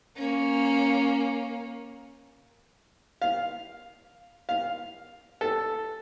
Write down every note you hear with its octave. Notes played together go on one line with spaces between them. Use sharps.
A#3 C#4
F5
F5
A4